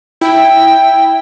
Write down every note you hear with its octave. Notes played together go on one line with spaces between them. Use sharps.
E4 G5